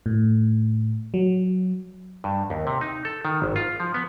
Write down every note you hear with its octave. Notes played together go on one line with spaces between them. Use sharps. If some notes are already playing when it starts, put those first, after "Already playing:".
A2
F#3
G2
D#2
C3
D#4
A4
D#3
G#1
F4
F3
B3